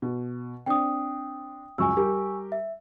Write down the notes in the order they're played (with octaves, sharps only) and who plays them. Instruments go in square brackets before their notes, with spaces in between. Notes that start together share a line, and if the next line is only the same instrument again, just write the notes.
[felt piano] B2
[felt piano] C4 D4 [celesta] G5 D#6
[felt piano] C#2 F#2 [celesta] G#5 C#6 E6
[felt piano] G3 G4 A#4
[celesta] E5